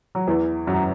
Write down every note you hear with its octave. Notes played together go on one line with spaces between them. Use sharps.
F#3
E2 E3
F#2 F#3